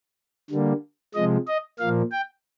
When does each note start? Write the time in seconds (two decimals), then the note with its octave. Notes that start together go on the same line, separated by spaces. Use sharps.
0.51 D3 G3 A#3
1.14 C3 F3 G#3 D#5
1.47 D#5
1.79 A#2 F3 A#3 F5
2.12 G5